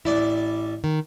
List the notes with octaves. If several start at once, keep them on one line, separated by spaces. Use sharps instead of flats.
A1 E4 D5
D#3